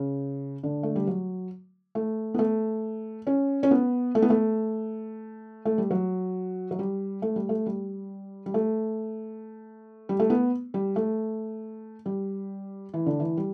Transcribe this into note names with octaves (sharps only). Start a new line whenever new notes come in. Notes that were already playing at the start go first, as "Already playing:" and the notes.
Already playing: C#3
D3
A3
G3
F#3
A3
B3
A3
C#4
C#4
B3
A3
B3
A3
A3
G3
F#3
F#3
G3
A3
G3
A3
G3
G3
A3
G3
A3
B3
G3
A3
G3
E3
D3
E3
G3